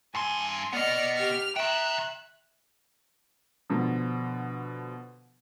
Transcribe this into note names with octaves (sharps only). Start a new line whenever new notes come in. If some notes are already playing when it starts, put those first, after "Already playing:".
G2 G#5 C6
B3 D5 D#5 F6 C#7
G4 F6
E5 G5 A#5 F#6
B2 D3 F3